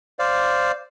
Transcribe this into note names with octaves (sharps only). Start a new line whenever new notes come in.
C5 D5 F5